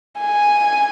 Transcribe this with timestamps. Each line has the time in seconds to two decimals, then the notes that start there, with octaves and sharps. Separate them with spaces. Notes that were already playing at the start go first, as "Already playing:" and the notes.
0.20 G#5